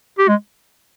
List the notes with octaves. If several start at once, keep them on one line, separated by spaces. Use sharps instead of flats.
G4
G#3